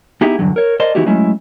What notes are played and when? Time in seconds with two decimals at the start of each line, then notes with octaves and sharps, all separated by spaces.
0.21 B3 D#4 E4 G4 G#4
0.39 E2 G2 D3 F#3
0.56 A#4 C#5
0.80 A#4 C5 D5 D#5 A5 C6
0.95 E3 B3 D#4 E4 F#4 G4
1.06 F#3 G#3 A3 C#4 E4